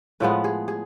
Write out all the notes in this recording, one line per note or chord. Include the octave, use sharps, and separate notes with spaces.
A2 F3 G#3 B3 B4
G#4
G#4